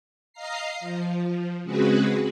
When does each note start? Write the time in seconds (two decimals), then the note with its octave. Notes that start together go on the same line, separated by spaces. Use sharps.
0.33 D#5 F5 A#5 C7
0.80 F3
1.63 C#3 G#3 C4 F#4 G#4 B4